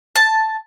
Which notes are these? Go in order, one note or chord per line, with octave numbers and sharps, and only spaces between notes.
A5